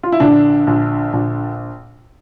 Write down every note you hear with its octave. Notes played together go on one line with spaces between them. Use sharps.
F4
E4
A#1 D3 D4
A#1
A#1